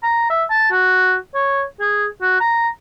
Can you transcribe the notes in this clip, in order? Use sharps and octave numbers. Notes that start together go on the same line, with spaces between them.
A#5
E5
A5
F#4
C#5
G#4
F#4
A#5